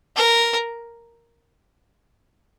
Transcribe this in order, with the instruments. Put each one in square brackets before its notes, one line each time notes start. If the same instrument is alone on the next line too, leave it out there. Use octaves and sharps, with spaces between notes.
[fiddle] A#4